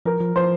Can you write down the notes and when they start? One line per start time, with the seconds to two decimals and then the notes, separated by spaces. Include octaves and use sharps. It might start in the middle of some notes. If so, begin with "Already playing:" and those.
0.06 F3 A#4
0.20 F3
0.36 F3 C5